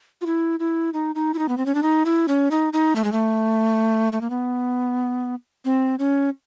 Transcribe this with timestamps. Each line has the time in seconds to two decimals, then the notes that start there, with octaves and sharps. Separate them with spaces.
0.21 F4
0.26 E4
0.60 E4
0.94 D#4
1.15 D#4
1.34 E4
1.39 D#4
1.49 B3
1.57 C4
1.66 C#4
1.75 D4
1.83 D#4
2.05 E4
2.28 C#4
2.51 D#4
2.73 D#4
2.96 A3
3.04 G#3
3.12 A3
4.13 A3
4.21 A#3
4.30 B3
5.65 C4
5.99 C#4